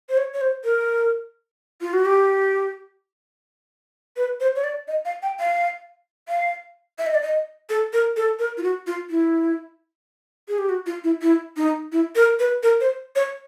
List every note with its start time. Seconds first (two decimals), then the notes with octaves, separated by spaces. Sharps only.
0.09 C5
0.17 C#5
0.34 C#5
0.41 C5
0.65 A#4
1.81 F4
1.93 F#4
2.05 G4
4.16 B4
4.40 C5
4.56 C#5
4.64 D5
4.88 D#5
5.05 F5
5.22 G5
5.40 F5
6.29 F5
6.99 E5
7.07 D#5
7.14 D5
7.22 D#5
7.70 A4
7.93 A#4
8.17 A4
8.39 A#4
8.58 F4
8.63 F#4
8.87 F4
9.10 E4
10.48 G#4
10.58 G4
10.69 F#4
10.86 F4
11.04 E4
11.22 E4
11.57 D#4
11.92 E4
12.15 A#4
12.39 B4
12.63 A#4
12.81 C5
13.16 C#5